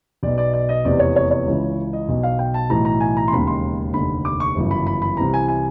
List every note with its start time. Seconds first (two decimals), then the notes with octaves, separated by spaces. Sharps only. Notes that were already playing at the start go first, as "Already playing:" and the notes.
0.23 B1 B2 D5
0.38 D5
0.54 D5
0.69 D#5
0.84 F1 E2 C3 D5
0.99 C#5
1.16 C#5
1.31 C#5
1.46 C#2 C#3 E3
1.93 D#5
2.08 B1 B2
2.23 F5
2.39 G5
2.54 A5
2.70 B1 A2 E3 A#5
2.85 A#5
3.01 G#5
3.17 A#5
3.28 C6
3.32 E1 D#2 C#3 B5
3.47 C6
3.94 F1 D#2 D3 B5
4.25 D6
4.40 C#6
4.55 G1 F#2 C#3 E3
4.71 B5
4.86 B5
5.02 B5
5.17 C2 C3 E3 A#5
5.34 G#5
5.48 G#5